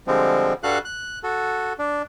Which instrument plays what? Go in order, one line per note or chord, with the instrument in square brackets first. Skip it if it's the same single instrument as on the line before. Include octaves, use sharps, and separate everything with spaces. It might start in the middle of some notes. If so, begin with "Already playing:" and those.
[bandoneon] D3 F3 G3 G#3 C4
G2 G3 F#4 A4 F5 F#6
F#6
F#4 A4
D4